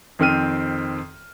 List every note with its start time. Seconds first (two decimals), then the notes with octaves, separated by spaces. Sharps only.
0.19 F2 D#3 C4 G5 F6 D#7